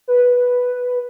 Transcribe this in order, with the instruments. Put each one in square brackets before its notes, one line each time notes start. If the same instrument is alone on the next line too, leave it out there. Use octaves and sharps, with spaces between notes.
[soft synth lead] B4